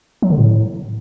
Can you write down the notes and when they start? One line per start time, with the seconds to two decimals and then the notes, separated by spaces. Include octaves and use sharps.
0.22 F#3
0.30 D3
0.38 A2